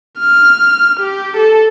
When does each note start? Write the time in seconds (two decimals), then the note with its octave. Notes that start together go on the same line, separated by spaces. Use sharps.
0.19 F6
1.00 G4
1.37 A4